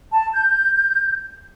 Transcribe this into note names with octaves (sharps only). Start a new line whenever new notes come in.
A5
G6